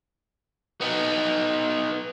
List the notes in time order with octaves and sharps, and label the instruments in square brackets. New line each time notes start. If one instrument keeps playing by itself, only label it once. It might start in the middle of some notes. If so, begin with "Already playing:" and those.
[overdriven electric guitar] B3 D#4